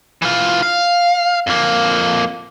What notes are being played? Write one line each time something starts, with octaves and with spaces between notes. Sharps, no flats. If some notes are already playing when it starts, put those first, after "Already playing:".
E3 F4
F5
F2 A#3